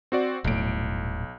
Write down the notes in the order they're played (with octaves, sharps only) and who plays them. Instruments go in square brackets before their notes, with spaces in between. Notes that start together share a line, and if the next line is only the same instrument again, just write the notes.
[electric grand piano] C4 F#4 D5
[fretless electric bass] D#1 A2 [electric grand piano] B1 D7